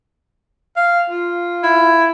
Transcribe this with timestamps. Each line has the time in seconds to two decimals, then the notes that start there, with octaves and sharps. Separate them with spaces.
0.76 F5
1.10 F4
1.63 E4